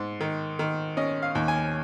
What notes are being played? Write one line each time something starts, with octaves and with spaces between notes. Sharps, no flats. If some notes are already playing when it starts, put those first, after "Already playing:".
Already playing: G#2
D#3
D#3
C#4 D#5
F5
D#2
G#5